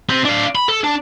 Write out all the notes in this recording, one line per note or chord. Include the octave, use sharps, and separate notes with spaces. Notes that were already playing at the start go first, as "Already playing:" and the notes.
C4 G4
D4 F5
B5
A4
D4